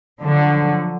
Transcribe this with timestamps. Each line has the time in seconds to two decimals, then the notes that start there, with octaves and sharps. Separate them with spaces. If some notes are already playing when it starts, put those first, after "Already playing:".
0.20 D3 F3 F#3